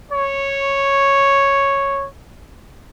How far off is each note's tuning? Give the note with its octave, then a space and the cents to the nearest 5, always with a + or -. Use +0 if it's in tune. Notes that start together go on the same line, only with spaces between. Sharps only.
C#5 -5